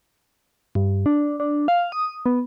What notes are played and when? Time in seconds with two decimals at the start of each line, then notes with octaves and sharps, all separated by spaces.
0.75 G2
1.06 D4
1.40 D4
1.68 F5
1.92 D#6
2.26 B3